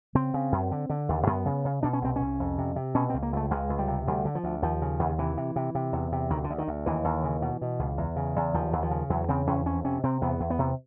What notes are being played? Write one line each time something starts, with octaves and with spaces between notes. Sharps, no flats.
C#3 C4
C#3
F#2
D3
D3
D#2
F#2 B3
C#3
C#3
B2 D4
C#4
C2 C4
C2 C#4
F2
C3
C3
B2 C#4
C#2 C4
A#3
C#2 A3
C#2 G#3
C#2
G3
C3
D2 G3
D3
F3
D2
D#2 F3
C#3
D#2
C3 E3
C3
C3
C3
E2
C3
D2 D#3
D3
D2
D#3
D2
D#2 E3
D#2
C#3
B2
B2
C#2
E2
C#3
E2
D#2 F3
D#2
F3
C#3
E2 F#3
C#3 C4
E2 C#4
F2 C#4
C3 C#4
C3 C4
E2 B3
E2
B3
C3